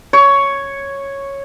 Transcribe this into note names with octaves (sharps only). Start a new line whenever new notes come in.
C#5